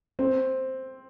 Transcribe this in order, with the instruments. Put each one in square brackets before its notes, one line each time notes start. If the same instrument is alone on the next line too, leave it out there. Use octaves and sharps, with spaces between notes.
[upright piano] C4